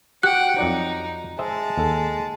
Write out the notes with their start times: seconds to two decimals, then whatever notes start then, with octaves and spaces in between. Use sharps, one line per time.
0.23 F#4 G4 F#5 G5 F#6
0.58 F2 F#3 D#4 D5
1.39 G#3 C5 D#5 E5 A5
1.78 D#2 A4